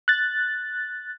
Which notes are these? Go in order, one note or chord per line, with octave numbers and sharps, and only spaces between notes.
F#6 A6